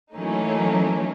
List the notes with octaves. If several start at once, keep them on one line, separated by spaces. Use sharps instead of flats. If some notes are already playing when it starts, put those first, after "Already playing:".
E3 F#3 A3 A#3 C#4 D#4